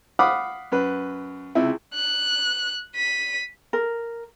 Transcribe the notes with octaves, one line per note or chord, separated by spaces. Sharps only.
F5 F#5 B5 D6 D#6
F#2 B4
C#2 C3 E4
F#6
B6 D#7
A#4